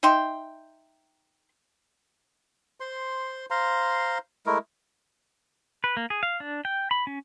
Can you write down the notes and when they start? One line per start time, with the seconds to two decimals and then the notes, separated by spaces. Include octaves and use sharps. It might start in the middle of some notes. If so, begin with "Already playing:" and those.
0.03 D#4 E5 G5 C6
2.80 C5 C6
3.50 C5 F5 A#5 C6
4.46 G#3 A3 E4 A#4
5.84 B4
5.97 A#3
6.10 G#4
6.23 F5
6.40 D4
6.65 G5
6.91 B5
7.07 C#4